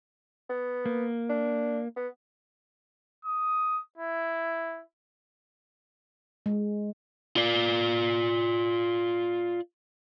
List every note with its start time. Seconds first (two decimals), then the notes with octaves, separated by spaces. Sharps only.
0.50 B3
0.86 A#3
1.30 D4
1.96 B3
3.25 D#6
3.98 E4
6.46 G#3
7.36 F4 D5